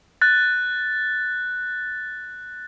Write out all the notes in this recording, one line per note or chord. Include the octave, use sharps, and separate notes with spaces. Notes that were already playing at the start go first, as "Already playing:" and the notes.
F#6 A6